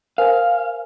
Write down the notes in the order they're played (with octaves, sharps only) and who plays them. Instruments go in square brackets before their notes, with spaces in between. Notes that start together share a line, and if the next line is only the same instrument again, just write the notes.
[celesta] A#4 C5 G#5 [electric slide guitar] F5